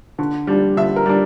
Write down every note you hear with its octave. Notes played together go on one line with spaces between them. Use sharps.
D3
G3 D4
D3 E5
A#4
G3 D4